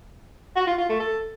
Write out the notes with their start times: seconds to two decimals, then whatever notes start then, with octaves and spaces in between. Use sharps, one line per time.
0.56 F#4
0.67 F4
0.78 F4
0.89 A3
1.00 A4